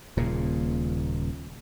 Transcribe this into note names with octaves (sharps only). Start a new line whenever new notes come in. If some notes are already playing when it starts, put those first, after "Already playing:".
D#1 A#2 C#3